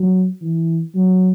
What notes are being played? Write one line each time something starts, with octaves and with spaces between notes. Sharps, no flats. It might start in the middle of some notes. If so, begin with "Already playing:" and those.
Already playing: F#3
E3
F#3